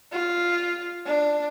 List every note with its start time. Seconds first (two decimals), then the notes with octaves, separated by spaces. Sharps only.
0.12 F4
1.06 D4